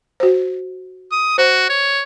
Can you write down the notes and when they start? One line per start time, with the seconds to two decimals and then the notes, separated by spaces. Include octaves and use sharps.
0.20 F#4 C5
1.12 D#6
1.38 F#4 C5
1.69 C#5